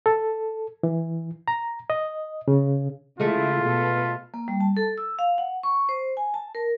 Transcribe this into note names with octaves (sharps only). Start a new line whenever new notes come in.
A4
E3
A#5
D#5
C#3
C#3 E3 G#3 A3 E4 F4
B2 A4 B4
A#3
G3
A5
A4
E6
F5
F#5
C#6
C5
G#5
A5
A#4